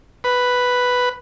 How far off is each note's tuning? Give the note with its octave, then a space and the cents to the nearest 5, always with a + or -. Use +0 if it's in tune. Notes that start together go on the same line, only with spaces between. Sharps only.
B4 +0